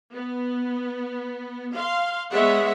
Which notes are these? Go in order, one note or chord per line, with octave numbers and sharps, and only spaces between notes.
B3
F5 C6
G#3 B3 G#4 C#5 E5 F#5